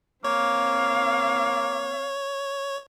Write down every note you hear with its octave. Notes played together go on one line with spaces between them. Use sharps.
A#3 C4 C#5 F5